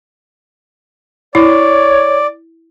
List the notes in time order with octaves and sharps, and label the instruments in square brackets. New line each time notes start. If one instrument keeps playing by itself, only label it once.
[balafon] E4 [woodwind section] C#5 [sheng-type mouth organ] D5